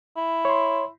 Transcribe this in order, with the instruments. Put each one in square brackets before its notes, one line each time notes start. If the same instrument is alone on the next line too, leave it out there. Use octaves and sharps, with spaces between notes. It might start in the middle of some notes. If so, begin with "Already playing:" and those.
[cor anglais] E4
[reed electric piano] C#5 C6